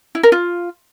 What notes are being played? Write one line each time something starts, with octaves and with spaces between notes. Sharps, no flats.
E4
A#4
F4